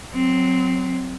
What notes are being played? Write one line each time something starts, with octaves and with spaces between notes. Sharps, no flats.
F#3 C4